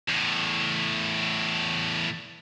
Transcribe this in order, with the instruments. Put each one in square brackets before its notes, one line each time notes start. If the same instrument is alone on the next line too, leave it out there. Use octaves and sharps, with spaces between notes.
[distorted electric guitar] E2 A2